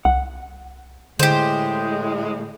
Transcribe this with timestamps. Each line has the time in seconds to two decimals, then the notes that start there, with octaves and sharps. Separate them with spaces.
0.05 C2 F#5
1.19 A2 D3 G#3 G4 C5